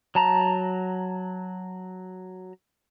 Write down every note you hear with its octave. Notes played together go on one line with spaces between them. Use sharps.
F#3 A5 A#5